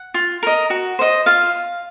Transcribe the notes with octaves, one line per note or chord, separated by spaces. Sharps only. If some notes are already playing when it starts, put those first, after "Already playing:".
Already playing: F#5
F4
A#4 D#5
F#4
C5 D#5
F4 F5